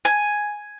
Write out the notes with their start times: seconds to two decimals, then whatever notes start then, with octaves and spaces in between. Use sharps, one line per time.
0.05 G#5